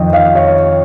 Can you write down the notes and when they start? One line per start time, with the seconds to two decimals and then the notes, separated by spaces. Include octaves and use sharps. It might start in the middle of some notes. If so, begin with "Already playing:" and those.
Already playing: F2 D#3 D#5
0.13 F5
0.35 C#5